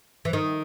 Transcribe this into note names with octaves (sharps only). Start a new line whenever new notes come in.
E3
D#3